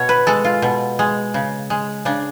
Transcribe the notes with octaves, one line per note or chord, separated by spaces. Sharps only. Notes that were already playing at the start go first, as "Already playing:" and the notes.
Already playing: B2 C#5
B4
G#3 A4
F4
B2
G#3
C#3
G#3
C#3 D4